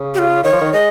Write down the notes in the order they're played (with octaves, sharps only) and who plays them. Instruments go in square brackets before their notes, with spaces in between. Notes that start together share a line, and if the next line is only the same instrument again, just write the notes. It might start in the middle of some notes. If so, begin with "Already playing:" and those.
Already playing: [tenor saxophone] C#3
[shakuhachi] G4
F4
[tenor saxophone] D#3 [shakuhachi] C#5
[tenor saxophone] F3
D#3
[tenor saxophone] G#3 [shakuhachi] D#5